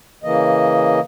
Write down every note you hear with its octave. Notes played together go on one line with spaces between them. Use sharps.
C#3 E3 A#3 D#5